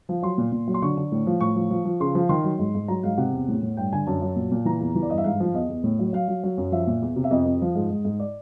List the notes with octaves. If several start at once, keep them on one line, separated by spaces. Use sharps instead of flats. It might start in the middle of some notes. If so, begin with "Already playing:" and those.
F3
F#3 C6
A#2
A#2
F#3
C6
D3 C#6
D3
A2
F3
A2 C#6
F3
F3
F3
C#3 C6
F3
D#3 C6
F#3
G#2
G#2
F#3 A#5
G#2 F5
C3 F#5
E2
A2
A2
G2 G5
D3 G#5
F#2 A5
F#3
A#2
A#2
E3 A#5
E2
E3
D5
G2 D#5
E5
G#2 F5
F3
E2 D#5
E2
A2
F#3
F#3 F5
F#3
F#3
F#2
F3 E5
A#2
E2
C3
E5
F2 D#5
F2
F3
G#2
G#2
G#2
D5